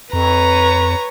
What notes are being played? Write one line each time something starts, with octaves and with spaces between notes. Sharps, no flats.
F2 B4 C#5 A#5